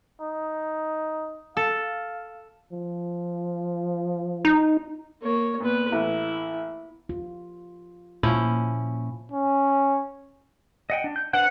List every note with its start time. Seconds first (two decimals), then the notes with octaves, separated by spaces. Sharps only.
0.20 D#4
1.57 A4 F5
2.72 F3
4.45 D#4
5.22 A#3 C#5
5.60 A#2 B3 B4
5.92 A1 E4
7.09 F4
8.23 A#2 F3 C#4 E4
9.32 C#4
10.90 D#5 F#5 G5
11.04 D4
11.16 G6
11.33 D4 B4 C5 F#5